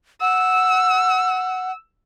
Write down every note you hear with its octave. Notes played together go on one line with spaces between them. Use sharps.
F#5 E6